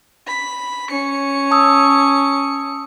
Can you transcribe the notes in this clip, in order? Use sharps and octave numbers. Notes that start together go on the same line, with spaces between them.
B5
C#4 C#7
A5 D#6 E6